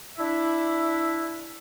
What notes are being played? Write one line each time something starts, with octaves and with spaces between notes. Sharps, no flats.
D4 E4 E5